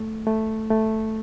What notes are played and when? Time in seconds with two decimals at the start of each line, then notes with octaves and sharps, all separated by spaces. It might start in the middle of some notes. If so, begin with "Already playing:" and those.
Already playing: A3
0.27 A3
0.71 A3